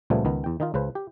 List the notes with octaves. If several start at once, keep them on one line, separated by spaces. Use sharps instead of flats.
C#2 A#2 F3 G3 A3 B3
C#2 D#3 B3
E2 G5
D#3 D#4 F4
C#2 C#3 B4 C5
G4